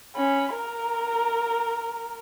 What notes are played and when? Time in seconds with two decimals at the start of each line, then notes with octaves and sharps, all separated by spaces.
0.16 C#4 B5
0.54 A#4 A#5